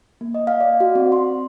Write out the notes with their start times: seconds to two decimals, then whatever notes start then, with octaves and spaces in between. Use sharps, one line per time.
0.21 A#3
0.34 D#5
0.47 F5
0.61 D5
0.80 F#4
0.95 C4
1.12 C6